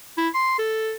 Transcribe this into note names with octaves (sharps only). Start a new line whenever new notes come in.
E4
C6
A4